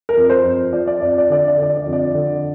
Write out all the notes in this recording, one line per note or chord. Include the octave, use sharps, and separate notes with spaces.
A#4
F2
C5
F2
F3 D5
D5
F2 D5
D5
D3 D5
D5
D3
D5
D5
F2
D5
D3